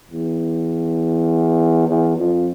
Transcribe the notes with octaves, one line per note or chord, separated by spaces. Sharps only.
E2
E2
F2